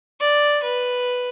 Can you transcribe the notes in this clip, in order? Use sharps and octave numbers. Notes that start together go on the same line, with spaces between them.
D5
B4